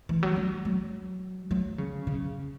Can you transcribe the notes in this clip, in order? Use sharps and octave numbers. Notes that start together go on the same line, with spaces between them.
E3
F#3
F#3
F#3
F#3
C#3
C#3